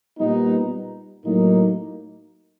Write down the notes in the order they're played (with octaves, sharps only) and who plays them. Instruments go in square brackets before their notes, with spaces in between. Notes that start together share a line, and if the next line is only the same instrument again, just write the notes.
[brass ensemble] A#2 G3 B3 D#4
A2 F#3 A#3 D#4